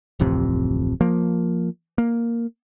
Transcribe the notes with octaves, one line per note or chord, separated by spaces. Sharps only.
D1 A1 F2 C3
F3 A#3
A#3